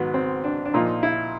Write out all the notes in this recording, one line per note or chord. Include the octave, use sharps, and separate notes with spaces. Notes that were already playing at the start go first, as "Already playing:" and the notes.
Already playing: G#2 D#3 F#3 B3
C4
D4
D4
A#2 F3 D#4
E4